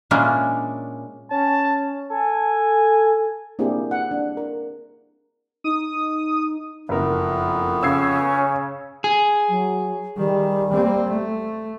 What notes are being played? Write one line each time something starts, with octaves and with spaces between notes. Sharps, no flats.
A#2 G#3 A#3 C#4 D4 E4
C#4 A5
A4 G#5
A#3 C4 D4 E4 G4 G#4
F#5
D4
A#4
D#4 D#6
F#1 F2 B3 A#4
C#3 C#4 E6 G#6 C7
G#4
F#3
D#3 G3
A#3 C4
A3